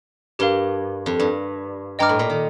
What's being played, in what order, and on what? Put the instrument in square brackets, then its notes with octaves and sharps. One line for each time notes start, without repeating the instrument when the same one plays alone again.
[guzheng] G2 [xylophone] G4 A#4 F5
[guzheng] F2
G2
[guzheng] G2 [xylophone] D#5 G5 A#5 D6 F6
[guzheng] A2
A#2
D#3